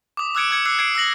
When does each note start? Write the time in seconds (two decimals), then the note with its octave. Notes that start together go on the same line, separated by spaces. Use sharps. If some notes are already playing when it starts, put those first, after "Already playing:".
0.17 D6 D#6
0.35 D6 E6 F#6 G#6 C#7 D7
0.51 D6 G#6 C#7
0.66 D6 E6 F#6 C7 C#7
0.79 G#6 C7 D7
0.95 E6 F#6 A#6 F#7